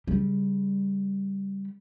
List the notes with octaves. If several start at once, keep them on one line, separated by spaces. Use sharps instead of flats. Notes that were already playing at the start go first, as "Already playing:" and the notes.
C#3 G3